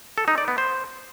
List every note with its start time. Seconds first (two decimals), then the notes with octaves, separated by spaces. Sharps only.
0.18 A4
0.28 D#4
0.38 D5
0.48 B3
0.58 C5